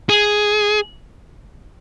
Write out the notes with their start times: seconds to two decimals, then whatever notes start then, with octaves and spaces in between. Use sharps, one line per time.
0.09 G#4